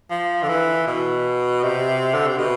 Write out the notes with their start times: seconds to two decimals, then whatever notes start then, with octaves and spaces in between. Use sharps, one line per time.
0.11 F3
0.43 D3
0.49 E3
0.87 B2
1.63 C3
2.14 D3
2.27 C3
2.39 B2